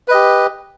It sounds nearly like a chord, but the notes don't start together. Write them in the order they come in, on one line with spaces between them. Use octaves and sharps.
B4 D#5 G4